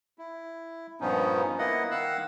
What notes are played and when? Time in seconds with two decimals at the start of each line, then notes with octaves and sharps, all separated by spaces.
0.18 E4
1.01 G2 A#2 F3 B3 C#4 D#4
1.59 A#3 B3 E4 D#5 F#5
1.91 D#3 F5 F#5 E6 F#6